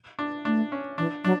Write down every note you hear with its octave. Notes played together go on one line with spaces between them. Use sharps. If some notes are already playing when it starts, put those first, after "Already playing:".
D4
A3 D4
C#4
E3 D4
F#3 D4